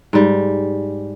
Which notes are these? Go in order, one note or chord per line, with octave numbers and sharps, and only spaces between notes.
G#2 G3